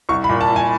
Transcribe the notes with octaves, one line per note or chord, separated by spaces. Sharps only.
C2 C#6
B5
A#2
A5
C2
G#5